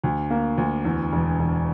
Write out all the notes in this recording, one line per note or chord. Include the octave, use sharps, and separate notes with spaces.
D2
A#3
D2
E2
E1
E1